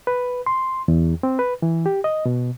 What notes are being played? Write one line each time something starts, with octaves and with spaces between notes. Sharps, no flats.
B4
C6
E2
C4
B4
E3
G4
D#5
B2